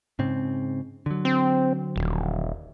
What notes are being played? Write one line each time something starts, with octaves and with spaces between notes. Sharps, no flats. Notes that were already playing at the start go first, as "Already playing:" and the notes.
G#2 C#3 C4
D3 F#3
C4
D#1